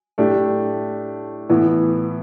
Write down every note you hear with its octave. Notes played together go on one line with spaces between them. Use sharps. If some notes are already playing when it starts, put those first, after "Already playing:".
A2 A3 D4 G4
A2 E3 B3